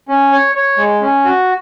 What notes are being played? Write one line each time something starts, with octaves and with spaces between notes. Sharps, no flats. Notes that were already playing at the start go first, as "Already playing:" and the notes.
C#4
C#5
C#5
G#3
C#4
F#4